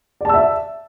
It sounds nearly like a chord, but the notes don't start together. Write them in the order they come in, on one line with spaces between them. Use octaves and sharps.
D5 A5 E6 E5